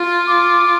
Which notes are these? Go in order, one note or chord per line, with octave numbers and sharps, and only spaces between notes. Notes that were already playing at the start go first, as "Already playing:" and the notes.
Already playing: F4
D6